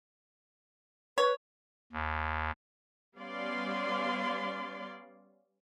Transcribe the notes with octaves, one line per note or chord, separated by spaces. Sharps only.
B4 C#5
D#2
G3 B3 C#4 D5 F5 C6